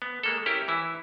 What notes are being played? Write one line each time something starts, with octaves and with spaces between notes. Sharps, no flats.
B3
G#3 A#3 A4
C#4 E4 G4 A#4
E3 E4